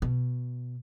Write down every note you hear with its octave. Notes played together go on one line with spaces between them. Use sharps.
B2